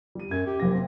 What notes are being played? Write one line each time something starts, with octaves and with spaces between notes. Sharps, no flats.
G3 D#7
F#2 G#6
G4
F#1 C3 A#6
C4